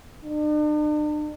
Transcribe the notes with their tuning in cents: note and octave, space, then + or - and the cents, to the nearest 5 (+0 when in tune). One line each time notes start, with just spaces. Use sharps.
D4 +45